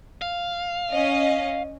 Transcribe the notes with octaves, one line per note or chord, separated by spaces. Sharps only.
F5
C#4 D#5